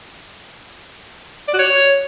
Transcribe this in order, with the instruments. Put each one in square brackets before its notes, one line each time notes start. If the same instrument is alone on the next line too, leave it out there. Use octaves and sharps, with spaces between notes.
[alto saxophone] D5
F#4
C#5